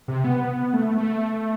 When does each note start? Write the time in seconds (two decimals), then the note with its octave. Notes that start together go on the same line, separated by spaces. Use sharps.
0.08 C3
0.24 B3
0.73 A3
0.98 A3